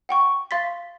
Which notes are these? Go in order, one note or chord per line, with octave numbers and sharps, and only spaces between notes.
F#5 G5 C#6
F5 C6 A6 B6